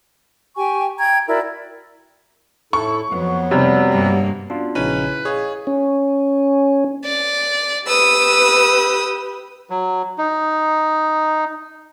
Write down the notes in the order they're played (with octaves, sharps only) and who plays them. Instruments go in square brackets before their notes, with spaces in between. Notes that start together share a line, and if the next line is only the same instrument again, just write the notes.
[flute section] G4 G5 G#5 C#6
G5 A#5 G#6
E4 F#4 A#4 D5
[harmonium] A2 E4 A4 [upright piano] C#6
[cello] F2 [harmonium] F#3 B3
[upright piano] C3 G3
[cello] G2 A#3
[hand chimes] B3 C#4 F#4 [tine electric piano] D4 F4
[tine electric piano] A#1 C#3 D#4 [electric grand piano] C#4 [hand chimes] E4 [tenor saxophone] B4
[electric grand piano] G#4 [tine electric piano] C#5 [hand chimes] D#5 F5
[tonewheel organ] C#4
[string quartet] D5
[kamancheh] G4 B4 [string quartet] D#6 E6
[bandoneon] F#3
D#4